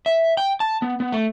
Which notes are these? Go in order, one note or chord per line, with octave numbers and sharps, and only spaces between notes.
E5
G5
A5
B3
B3
A3